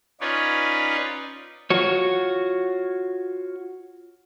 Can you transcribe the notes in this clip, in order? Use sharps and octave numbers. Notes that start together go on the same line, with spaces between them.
C#4 D#4 F4 B4 C#5 D5
F4 F#4 C#5